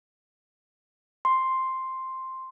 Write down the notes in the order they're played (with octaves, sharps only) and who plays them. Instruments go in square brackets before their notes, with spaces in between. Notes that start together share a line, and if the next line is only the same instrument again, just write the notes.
[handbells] C6